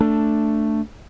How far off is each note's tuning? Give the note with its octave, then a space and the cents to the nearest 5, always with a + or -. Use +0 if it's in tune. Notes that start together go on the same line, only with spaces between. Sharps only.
A3 +10 D4 +0